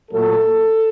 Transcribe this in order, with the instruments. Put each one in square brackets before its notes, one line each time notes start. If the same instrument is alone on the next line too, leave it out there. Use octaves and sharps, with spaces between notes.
[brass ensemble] A#2 F#3 A3 A4